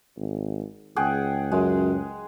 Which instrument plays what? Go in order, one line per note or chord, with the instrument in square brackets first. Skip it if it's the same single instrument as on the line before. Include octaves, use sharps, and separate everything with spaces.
[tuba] G#1
[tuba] C#2 [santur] G#4 F#5 G5
[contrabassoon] F#2 [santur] G#3